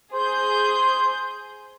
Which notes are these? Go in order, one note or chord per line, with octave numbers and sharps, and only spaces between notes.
G#4 C5 G6